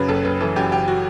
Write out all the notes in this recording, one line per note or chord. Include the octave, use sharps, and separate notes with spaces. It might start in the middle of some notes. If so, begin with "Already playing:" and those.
Already playing: F#2 C#3 B4
F#1 A4
F#1 B4
E3 A4
F#2 G4
F#1 G4
F#4